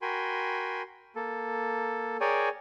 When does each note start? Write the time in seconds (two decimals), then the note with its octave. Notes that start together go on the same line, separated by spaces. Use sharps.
0.02 F#4 A#4 G5 G#5 B5 C6
1.16 A#3 A4
2.21 G#4 A#4 C#5 D5 G5 G#5